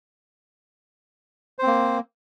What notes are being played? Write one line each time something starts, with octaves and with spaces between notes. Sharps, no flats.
A#3 C4 C5